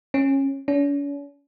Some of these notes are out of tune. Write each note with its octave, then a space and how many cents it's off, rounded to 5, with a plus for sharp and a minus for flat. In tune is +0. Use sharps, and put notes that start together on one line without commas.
C#4 -20
C#4 +45